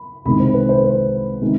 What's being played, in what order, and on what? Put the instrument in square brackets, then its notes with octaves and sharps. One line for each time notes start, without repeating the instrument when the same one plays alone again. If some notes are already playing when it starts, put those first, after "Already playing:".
Already playing: [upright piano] B5
C2 C3 D#3 G#3 B5
C5
B4
C5
C5
C3 D#3 G#3